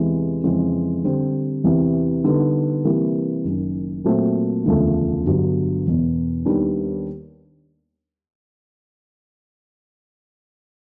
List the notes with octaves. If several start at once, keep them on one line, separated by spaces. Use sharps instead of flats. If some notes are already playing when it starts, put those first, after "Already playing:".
Already playing: E2 C3 E3 G#3
F2 C#3 E3 G#3 C4
D3 G3 C4
E2 C3 E3
D3 G3 B3 D#4
C3 E3 G3 A#3
F#1 F#2 D#3
A#2 F#3 A3 C4
E1 D2 C#3 F3 A3
G1 G2 D3 F#3
E1 E2 B2
D#2 D#3 G3 B3 D4